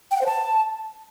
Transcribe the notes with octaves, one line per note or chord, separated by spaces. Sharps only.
G5
F#5
C5
A5